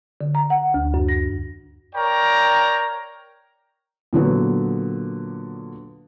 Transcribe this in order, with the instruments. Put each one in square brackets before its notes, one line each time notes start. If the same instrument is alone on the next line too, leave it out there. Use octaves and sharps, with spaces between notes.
[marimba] D3
A#5
F#5
D2
F#2
A#6
[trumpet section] A#4 C#5 D5 G5 A#5
[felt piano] A#2 D3 F#3 B3